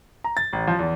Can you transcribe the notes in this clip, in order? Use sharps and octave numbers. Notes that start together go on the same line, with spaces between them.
A#5
A6
A1
F3
E2